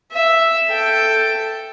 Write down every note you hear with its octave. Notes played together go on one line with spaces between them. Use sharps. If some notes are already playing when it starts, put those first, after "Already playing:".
E5
A4 G5